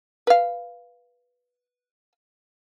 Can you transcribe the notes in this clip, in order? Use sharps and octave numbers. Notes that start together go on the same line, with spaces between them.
B4 F5